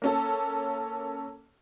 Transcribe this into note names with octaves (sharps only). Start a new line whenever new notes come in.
A#3 C#4 A4